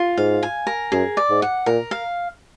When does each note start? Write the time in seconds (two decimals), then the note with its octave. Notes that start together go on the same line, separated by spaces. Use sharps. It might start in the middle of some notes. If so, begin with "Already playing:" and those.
Already playing: F4
0.17 G#2 F5
0.43 G#5
0.67 A#4
0.92 F#2 G#4
1.17 D5
1.30 G#2
1.42 F#5
1.66 A#2 A#4
1.91 F5